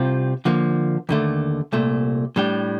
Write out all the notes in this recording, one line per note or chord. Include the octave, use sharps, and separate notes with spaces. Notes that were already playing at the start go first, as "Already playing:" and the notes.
Already playing: C2 C3 G3 C4 F4
D3 F3 A#3
D#2 D3 A3
C2 A#2 A3
A2 G3 D4 G4